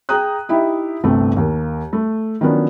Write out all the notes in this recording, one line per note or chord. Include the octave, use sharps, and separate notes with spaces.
G#4 G5 A#5 D#6 F#6
D#4 E4 G4 E5
G1 C2 A3 C4
D#2 A#3
A3
D#3 F3 F#3 B3 C#4 D4